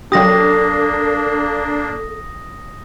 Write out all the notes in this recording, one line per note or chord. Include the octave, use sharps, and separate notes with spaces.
F#3 A#3 D4 G4 A4 D#6 A#6